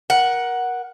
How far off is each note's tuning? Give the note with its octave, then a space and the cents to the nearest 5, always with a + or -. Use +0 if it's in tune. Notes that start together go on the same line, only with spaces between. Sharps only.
A#4 +25 F#5 +0